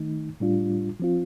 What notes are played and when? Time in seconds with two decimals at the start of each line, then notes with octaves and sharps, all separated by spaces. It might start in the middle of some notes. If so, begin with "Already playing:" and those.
Already playing: D#3 A3 D#4
0.40 A2 G3 D4 F4
1.00 F3 C4 F4